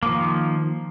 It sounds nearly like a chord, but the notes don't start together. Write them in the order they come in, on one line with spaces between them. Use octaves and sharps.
A#3 F3 D#3